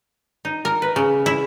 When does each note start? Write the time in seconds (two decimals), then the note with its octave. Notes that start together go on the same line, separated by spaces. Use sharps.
0.45 D#4
0.65 A#4
0.82 B4
0.96 C#3
1.26 E4